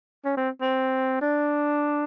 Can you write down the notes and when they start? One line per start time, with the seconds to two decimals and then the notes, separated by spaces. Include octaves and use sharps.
0.25 C#4
0.37 C4
0.61 C4
1.21 D4